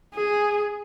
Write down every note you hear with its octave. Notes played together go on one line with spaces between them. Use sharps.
G#4